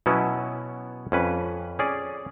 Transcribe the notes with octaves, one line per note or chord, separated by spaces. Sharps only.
B2 F#3 B3 C#4 E4
F2 C#4 B4
C#4 G#4 D5